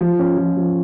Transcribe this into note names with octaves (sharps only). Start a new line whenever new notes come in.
F3
C#4
F3
F3